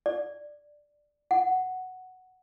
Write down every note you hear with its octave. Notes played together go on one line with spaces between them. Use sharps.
D5
F#5